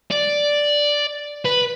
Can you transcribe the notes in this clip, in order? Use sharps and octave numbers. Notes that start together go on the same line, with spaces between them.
D5
B4